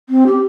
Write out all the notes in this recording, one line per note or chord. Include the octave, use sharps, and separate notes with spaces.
C4
G4